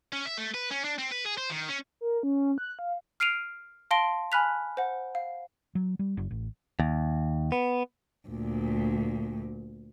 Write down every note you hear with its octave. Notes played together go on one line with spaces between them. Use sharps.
C#4
E5
A3
B4
C#4
D4
C4
B4
G#4
C5
D#3
C#4
A#4
C#4
F#6
F5
F6 C7 D7 D#7 F7
F5 A5 C6 A#6 D7 G7
G#5 B5 F6 F#6 B6 F7
C5 F#5
F5
F#3
G3
F#1
A1
D#2
B3
D2 A#2